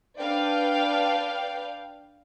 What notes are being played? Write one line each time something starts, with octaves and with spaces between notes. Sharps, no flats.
D4 B4 D5 F5 G5